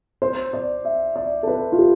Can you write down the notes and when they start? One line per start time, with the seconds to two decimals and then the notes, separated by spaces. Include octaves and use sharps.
0.22 C5
0.53 D5
0.85 E5
1.16 D5
1.43 A4
1.47 B4
1.72 F4
1.78 G4